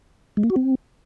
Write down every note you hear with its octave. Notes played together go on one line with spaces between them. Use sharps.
G#3
A#3
F#4
C4